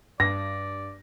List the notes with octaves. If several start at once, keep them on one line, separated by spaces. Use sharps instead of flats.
G2 D5 A#6